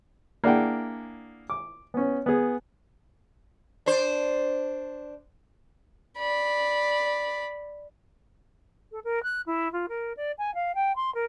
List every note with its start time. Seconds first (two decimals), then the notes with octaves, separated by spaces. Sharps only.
0.44 A#3 D4 E4 G#4 F#5 G5
1.50 D6
1.94 B3 C#4
2.26 B3 G#4
3.86 D4 C5
6.18 D5 B5
8.92 A4
9.04 A#4
9.23 F#6
9.46 E4
9.72 F4
9.88 A#4
10.17 D5
10.38 G#5
10.54 F5
10.75 G5
10.96 C6
11.14 A#4